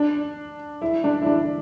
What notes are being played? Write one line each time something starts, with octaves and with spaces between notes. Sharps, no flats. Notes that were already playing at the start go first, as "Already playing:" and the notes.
Already playing: D4
E4
D4
E4
D4